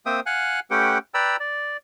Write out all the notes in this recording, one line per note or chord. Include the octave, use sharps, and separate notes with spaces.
A#3 C4 C5 E5 G5 D#6
F5 F#5 G#5 F#6
A3 C#4 G4 B4 F#5 G5
B4 D5 G5 A#5 B5 E6
D5